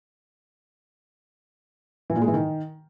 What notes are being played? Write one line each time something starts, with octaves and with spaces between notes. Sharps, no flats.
E3
A#2
G#3
E3
D#3